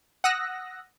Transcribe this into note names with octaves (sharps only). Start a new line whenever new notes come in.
F#5 D#6 E6 F#6 A#6